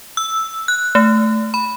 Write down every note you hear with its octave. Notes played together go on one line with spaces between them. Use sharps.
E6
F#6
A3
B5